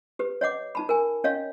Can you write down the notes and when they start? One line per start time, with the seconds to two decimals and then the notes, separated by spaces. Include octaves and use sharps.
0.19 G4 B4
0.41 C#5 D#5 F#5 D6
0.75 D#4 A5 B5
0.89 A#4 G#5
1.24 C#4 C#5 D#5 F5